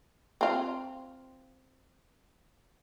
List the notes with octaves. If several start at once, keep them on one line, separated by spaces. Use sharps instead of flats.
C4 F4